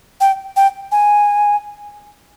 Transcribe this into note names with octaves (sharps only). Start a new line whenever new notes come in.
G5
G5
G#5